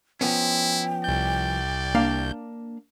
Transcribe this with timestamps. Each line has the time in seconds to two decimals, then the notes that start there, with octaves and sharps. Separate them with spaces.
0.21 F3 B3 C#4 E4 G5
1.04 C2 D5 G6
1.95 A#3 D4 F5